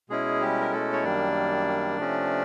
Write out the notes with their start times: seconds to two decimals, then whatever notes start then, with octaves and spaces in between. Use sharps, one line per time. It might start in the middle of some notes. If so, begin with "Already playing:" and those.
0.09 B2 G#3 C#4 E4 G#4
0.41 G3 G4
0.61 A#4
0.72 A3 A4
0.93 C#5
1.03 F#2 D#3 G3 A#3 D4 D5
1.98 C3 F3 A3 C#4